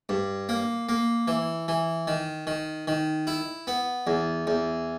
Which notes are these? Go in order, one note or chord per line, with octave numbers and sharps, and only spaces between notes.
G2
A#3
A#3
E3
E3
D#3
D#3
D#3
E4
B3
E2
E2